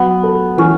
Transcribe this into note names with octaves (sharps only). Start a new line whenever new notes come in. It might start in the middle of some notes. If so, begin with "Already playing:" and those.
Already playing: F#3 B3
A4
E3 C#4